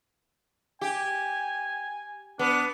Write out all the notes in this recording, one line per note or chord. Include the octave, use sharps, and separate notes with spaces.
G4 G#5
B3 D4